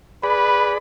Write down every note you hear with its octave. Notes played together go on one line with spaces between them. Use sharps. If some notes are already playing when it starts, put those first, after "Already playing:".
G#4 B4 D5 B5